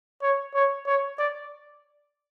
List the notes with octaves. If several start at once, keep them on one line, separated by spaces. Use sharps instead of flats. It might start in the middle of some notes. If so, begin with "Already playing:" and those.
C#5
C#5
C#5
D5